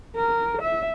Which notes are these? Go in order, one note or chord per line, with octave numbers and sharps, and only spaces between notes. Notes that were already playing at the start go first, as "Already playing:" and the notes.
A#4
E5